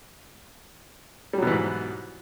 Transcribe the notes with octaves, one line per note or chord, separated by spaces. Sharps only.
G#2 B2 E3 F#3 G3